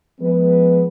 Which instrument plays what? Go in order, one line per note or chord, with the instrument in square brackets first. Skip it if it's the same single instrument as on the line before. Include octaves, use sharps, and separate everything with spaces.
[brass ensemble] F3 G#3 B3 B4